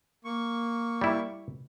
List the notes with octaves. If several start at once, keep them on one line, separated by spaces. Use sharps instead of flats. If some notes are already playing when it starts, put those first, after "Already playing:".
A#3 C#6
G3 E4